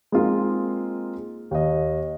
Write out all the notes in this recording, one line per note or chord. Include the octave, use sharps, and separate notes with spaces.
G#3 A#3 C4 D#4 F4 A#4
D#2 D#5